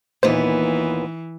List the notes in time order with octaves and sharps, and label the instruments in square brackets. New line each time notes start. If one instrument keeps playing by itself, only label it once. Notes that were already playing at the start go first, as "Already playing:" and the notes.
[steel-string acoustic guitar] D#2 A#2 B3 [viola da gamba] E3 [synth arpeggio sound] C5